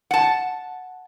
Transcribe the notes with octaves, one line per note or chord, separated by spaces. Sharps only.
F#5 A5